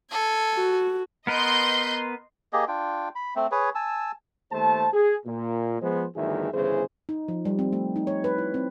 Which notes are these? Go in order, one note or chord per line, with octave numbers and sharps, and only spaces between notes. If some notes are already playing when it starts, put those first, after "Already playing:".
A4 G#5
F#4
B3 A#4 B4 D#5 C6 G6
A#3 G4 G#4 D#5
D4 F4 G5
B5
A3 C4
G#4 B4 C#5
G#5 A5 E6
D#2 A3 C5 A5
G#4
A#2
F3 G#3 B3 G#4 C5
G1 D2 D#3 E3 G#4 E5
G1 E2 C#3 E3 G#4 C5
D#4
F3
G3
C4
A3
D#4
C#5
B4
E4
C4